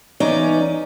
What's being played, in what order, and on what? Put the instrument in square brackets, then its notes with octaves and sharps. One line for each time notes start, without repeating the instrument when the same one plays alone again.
[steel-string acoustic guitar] E2 C#4 D#4 D5